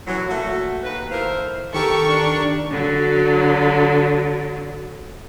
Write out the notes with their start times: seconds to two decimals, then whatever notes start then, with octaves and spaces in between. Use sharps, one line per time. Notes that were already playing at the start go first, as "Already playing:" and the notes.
0.07 F#2 A2 E3 F#3
0.29 A#2 A3 F#4
0.83 D#2 B4
1.12 D#3 A3 E4 A#4 C5 F5
1.74 D#3 G4 A4 A#4 C#6
2.09 D4
2.71 D3 F#3